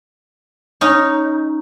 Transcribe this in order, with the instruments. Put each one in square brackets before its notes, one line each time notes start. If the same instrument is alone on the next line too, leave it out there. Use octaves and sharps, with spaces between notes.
[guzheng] C#4 D#4